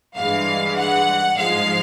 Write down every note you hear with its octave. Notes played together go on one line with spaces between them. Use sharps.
G2 E3 G#3 F5
F#5
G#2 F3 G#3 F5